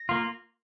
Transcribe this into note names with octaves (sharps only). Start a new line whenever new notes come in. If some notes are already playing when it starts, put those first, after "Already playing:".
Already playing: A#6
A#3 F4